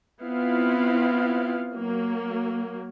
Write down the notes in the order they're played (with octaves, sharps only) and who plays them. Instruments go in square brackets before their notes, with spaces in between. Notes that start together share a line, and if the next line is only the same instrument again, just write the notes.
[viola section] B3 C4 E4 F4 F5
F#3 A#3